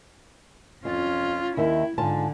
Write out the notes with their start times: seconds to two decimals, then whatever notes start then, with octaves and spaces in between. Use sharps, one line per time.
0.85 F2 C#4 F4
1.57 D#2 D#3 E4 E5
1.98 G#2 D3 F4 A5